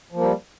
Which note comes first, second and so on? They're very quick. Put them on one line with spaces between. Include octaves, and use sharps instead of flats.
F3 A#3 G3